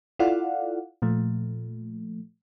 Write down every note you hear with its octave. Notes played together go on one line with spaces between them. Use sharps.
E4 F4 A4 D5 F5 F#5
A#2 F3 A3